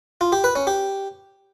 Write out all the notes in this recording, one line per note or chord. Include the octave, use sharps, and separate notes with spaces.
F4
G4
B4
C#4
G4